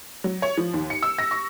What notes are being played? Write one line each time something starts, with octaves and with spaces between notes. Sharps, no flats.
F#3
C#5
F3
D#2
C#7
E6
A#6
C#6